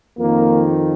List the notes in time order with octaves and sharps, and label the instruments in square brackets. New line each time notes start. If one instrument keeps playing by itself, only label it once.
[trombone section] F2 D#3 A#3